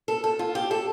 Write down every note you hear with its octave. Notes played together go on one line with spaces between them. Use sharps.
A4
A4
F4
G4
A4